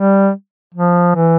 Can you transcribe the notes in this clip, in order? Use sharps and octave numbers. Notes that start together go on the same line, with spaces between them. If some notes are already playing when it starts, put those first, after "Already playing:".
Already playing: G3
F3
E3